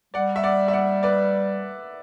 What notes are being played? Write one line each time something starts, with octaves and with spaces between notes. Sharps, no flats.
G3 D5 F#5
E5
D5 F#5
E5
D5 F#5
B4 D5